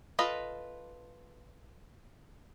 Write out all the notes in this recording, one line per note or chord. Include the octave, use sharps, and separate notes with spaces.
F4 A4 B4 D#5